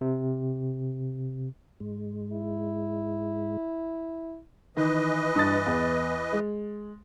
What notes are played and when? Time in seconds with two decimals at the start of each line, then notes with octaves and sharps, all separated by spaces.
0.01 C3
1.80 G#2 G#3
2.32 E4
4.77 D#3 E3 B4 D#5
5.35 G2 D#6 A6
5.66 E2
6.33 G#3